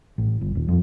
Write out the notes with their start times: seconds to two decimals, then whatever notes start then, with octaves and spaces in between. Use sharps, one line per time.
0.18 A1
0.41 G1
0.55 D#1
0.68 F2